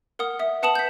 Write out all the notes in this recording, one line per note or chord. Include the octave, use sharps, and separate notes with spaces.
A#4 F#5 D#6
E5 D#6
B4 F#5 A5 D#6 E7 F#7
G6 B6